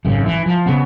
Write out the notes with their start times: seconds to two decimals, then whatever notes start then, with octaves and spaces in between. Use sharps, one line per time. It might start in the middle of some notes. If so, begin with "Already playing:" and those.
0.05 G#1 F#2 C#3
0.26 E3
0.46 F3
0.66 C#3 B3